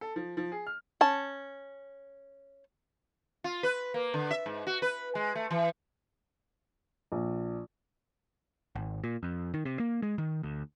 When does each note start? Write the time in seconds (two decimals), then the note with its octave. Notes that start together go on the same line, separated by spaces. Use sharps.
0.01 A4
0.16 F3
0.37 F3
0.52 G#4
0.67 F6
1.01 C#4 A5
3.44 F4
3.63 B4
3.94 A#3
4.14 D3
4.31 E5
4.46 G#2
4.67 F#4
4.82 B4
5.15 G#3
5.35 A3
5.51 E3
7.12 A#1
8.75 G#1
9.04 A#2
9.23 F2
9.54 D#3
9.65 C3
9.80 A#3
10.02 G#3
10.18 D#3
10.43 D2